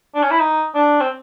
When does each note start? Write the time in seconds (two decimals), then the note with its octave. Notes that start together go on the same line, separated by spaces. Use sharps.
0.15 D4
0.23 C#4
0.31 E4
0.40 D#4
0.75 D4
1.01 C4